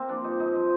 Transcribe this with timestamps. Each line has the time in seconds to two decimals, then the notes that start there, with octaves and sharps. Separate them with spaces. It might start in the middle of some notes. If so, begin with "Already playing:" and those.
Already playing: A#3 C4
0.09 F3 D4
0.24 G2 D#4
0.40 F3 D#4
0.55 F3